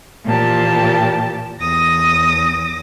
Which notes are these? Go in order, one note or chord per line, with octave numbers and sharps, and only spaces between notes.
A#2 E3 F3 G4 A5
E2 D#6 A#6